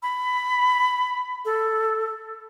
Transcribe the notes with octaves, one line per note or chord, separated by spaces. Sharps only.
B5
A4